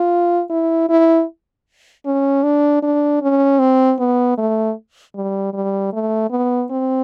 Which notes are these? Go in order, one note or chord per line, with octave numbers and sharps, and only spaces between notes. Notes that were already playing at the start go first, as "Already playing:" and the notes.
Already playing: F4
E4
E4
C#4
D4
D4
C#4
C4
B3
A3
G3
G3
A3
B3
C4